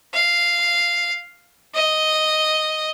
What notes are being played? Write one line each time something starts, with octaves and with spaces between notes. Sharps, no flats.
F5
D#5